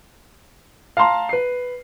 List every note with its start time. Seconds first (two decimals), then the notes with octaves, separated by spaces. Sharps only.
0.97 F5 A5 A#5 C6
1.29 B4 C7